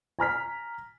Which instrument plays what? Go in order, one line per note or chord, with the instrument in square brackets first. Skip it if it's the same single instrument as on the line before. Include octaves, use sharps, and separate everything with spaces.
[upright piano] G#5 A#5 F6 B6